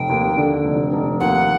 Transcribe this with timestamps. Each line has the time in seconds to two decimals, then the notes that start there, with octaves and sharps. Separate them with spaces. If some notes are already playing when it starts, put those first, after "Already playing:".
Already playing: F1 G5
0.09 D#2
0.37 D3
0.65 F1
0.93 F1
1.20 D#2 F#5